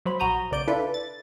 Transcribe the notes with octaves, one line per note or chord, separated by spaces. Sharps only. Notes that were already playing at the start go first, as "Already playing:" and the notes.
F#3 C5 B5
A#1 F#4 A#5 D#6 G6
B1 C#3 D5 G6 D7
D4 E4 F4 A4 B4
A6